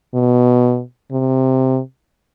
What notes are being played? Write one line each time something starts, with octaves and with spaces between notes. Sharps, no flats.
B2
C3